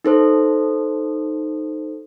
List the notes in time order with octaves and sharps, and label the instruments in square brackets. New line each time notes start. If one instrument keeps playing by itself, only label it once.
[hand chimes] D#4 A4 C5